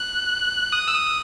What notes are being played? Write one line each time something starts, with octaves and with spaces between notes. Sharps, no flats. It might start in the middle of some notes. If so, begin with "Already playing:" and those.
Already playing: F#6
D#6
E6
D#6